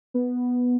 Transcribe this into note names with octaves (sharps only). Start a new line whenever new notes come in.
B3